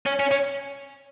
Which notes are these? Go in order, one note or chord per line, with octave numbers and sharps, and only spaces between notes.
C#4
C#4
C#4